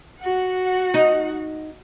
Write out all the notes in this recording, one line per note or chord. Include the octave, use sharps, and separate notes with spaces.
F#4 F#5
D#4